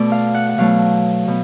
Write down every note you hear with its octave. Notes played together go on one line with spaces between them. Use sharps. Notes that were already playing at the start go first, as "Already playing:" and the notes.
Already playing: B2 A3 D5
F5
F#5
F#5
B2 F#3 A3 F5
B2